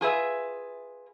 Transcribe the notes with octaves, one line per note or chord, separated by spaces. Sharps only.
F4 G#4 B4 E5